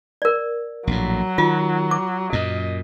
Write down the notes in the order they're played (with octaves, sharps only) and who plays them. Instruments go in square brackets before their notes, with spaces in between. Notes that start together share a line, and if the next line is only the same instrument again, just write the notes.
[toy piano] A#4 D5
[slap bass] A#1 A2 [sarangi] F#3
[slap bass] D#3 [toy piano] F4
[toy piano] D6
[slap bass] F#2 A#2 [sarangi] D#5